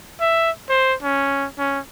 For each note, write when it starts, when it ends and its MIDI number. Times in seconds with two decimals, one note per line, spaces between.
0.20 0.51 76
0.70 0.94 72
1.02 1.46 61
1.58 1.79 61